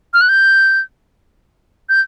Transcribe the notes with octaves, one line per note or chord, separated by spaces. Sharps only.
F6
F#6
G6
G6